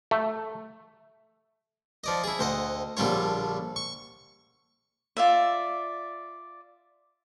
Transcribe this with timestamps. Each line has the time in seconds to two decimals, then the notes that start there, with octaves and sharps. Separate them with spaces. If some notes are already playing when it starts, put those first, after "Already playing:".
0.11 A3
2.04 F3 D5 D#5
2.24 E4 G#4
2.39 D2 C5 D#5 F#5
2.97 A#1 D3 G3 F4 C#5
3.76 C#6
5.17 F4 D5 E5